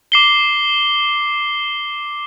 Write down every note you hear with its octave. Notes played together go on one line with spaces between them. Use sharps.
D6 C7 G7